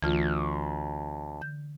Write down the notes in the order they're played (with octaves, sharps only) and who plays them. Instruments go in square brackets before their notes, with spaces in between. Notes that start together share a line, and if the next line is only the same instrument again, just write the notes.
[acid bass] D2 [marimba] E3 A3 F4
[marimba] D3 G6